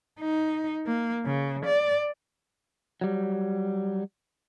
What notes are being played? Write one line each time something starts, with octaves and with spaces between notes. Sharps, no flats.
D#4
A#3
C#3
D5
F#3 G3